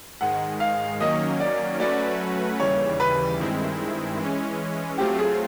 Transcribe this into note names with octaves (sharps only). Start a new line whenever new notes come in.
G#2 D#3 G#3 F#5
F5
D#3 F#3 A#3 C#4 D#5
D5
F#3 A3 C#4 F#4 B4 D5
D#2 C#3 E3 G3 C#5
B4
G2 D#3 G#3 C4 E4
E3 G#3 C#4
F#3 A3 C4 F4 G4
G#4